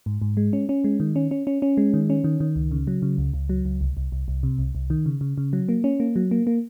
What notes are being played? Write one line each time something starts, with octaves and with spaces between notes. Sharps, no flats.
G#2
G#2
G#3
C#4
C#4
G#3
D#3
C#4
C#4
C#4
C#4
G#3
D#3
C#4
D#3
D#3
C#2
C#3
F#3
C#3
C#2
C#2
F#3
C#2
C2
C2
C2
C2
C3
C2
C2
D#3
C#3
C#3
C#3
F#3
A#3
C#4
A#3
F#3
A#3
A#3